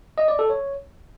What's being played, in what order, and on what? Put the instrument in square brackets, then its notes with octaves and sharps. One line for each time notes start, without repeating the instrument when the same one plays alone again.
[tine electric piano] D#5
D5
A4
C#5